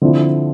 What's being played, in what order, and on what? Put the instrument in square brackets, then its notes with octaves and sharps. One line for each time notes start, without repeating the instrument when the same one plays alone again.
[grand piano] D3 F3 C4 E4